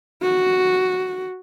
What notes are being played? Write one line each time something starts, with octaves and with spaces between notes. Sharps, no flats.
F#4